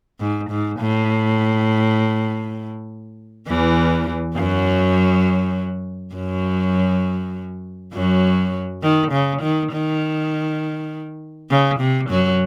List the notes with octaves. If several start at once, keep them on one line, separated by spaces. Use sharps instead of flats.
G#2
G#2
A2
E2 E3
F#2 F#3
F#2 F#3
F#2 F#3
D#3
C#3
D#3
D#3
C#3
C3
F#2 F#3